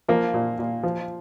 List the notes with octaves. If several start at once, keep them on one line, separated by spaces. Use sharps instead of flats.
F3 A#3
A#2
A#2
F3